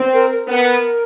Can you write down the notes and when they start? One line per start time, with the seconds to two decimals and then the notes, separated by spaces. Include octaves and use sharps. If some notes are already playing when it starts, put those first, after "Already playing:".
Already playing: C4
0.13 A#4
0.30 A#4
0.48 B3 A#4